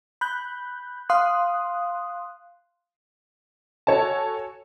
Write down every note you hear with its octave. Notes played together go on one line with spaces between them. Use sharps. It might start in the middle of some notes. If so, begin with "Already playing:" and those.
B5 F#6 G6
F5 C6 D#6 F#6
F#4 A4 C#5 G#5 A5